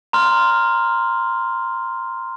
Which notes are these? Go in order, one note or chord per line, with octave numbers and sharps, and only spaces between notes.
A#5 C6 F6